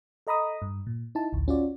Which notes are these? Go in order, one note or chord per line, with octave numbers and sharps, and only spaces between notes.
A4 D#5 A#5 B5 D#6
G2
A#2
D#4 E4 A5
A1 D2
C#4 F4 F#4 D5